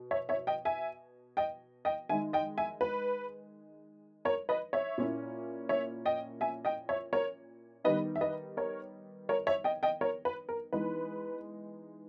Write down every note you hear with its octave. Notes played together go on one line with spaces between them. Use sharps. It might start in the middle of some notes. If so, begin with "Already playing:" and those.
Already playing: B2
C#5 E5
C#5 E5
D#5 G5
E5 G#5
D#5 G5
D#5 G5
D#3 G#3 D#4 E5 G#5
D#5 G5
E5 G#5
B4
A#4 C#5
B4 D#5
C#5 E5
A#2 A#3 C#4 E4
C#5 E5
D#5 G5
E5 G#5
D#5 G5
C#5 E5
A#4 C#5
D#3 G3 B3 D#4 B4 D#5
E5
B4 D#5
A#4 C#5
A#4 C#5
C#5 E5
D#5 G5
D#5 G5
A#4 C#5
B4
A#4
E3 G#3 B3 D#4 B4